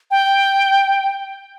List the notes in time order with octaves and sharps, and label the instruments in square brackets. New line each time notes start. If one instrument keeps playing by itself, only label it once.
[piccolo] G5